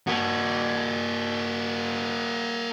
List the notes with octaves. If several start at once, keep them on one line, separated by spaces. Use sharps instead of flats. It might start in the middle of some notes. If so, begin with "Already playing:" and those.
A#3 F#4